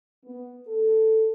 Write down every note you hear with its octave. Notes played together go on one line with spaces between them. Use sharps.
B3
A4